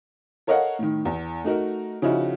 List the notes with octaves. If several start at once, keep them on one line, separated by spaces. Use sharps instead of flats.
A4 A#4 C#5 D#5 F5 F#5
A2 D#3
E2
A3 D#4 F#4 A#4
C#3 F3 D#4 E4 F#4